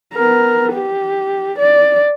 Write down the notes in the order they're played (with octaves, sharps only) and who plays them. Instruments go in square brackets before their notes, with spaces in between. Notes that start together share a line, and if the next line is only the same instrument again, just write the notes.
[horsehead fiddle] B3 A#4
G4
D5